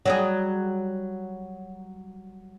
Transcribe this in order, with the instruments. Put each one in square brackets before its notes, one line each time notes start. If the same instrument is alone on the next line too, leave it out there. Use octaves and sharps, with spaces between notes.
[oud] F#3 G3 G#4